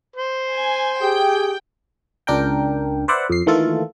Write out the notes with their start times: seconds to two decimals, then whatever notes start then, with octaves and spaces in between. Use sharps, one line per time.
0.16 C5
0.54 G#5
1.01 G4 G#4 G5
2.27 C#2 D4 A#4 G5
3.08 B4 C5 D5 E5 F#5
3.30 F2 C7
3.46 D#3 E3 A3 A#3 F4 A4